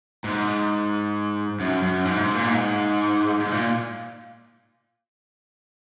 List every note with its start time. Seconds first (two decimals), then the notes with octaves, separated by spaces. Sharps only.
0.24 G#2
1.60 F#2
1.82 F#2
2.05 G#2
2.20 G#2
2.35 A#2
2.50 G#2
3.40 G#2
3.52 A#2